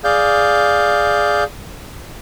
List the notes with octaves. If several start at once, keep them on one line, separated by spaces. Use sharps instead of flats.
G#4 D5 F5 G6